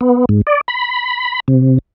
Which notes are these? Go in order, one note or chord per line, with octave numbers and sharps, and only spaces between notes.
B3
G#2
D5
B5
C3